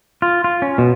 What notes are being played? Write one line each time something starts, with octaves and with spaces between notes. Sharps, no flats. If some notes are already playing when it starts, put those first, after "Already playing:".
F4
F4
C#4
B2